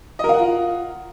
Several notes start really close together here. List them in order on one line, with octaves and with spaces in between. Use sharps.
D#5 A#4 F5 F#5 F4